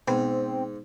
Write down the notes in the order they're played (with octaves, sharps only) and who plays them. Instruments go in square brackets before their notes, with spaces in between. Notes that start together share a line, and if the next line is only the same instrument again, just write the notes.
[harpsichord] G#2 G#5 [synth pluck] B2 B3 [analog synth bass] C4